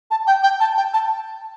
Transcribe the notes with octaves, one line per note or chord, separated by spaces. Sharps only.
A5
G5
G5
A5
G5
A5